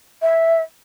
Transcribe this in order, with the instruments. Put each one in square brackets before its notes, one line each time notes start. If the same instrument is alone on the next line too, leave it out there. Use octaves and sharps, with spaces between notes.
[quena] E5